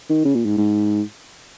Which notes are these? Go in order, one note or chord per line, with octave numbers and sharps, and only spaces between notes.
D#3
C#3
A#2
G#2
G#2